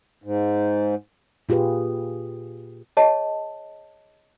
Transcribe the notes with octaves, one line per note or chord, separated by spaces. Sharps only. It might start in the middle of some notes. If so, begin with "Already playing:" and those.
G#2
A#2 F4 G4 G#4 B4
G#4 C#5 D#5 A5